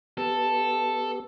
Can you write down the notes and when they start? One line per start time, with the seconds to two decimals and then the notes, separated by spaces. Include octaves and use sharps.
0.17 B3 G4 A4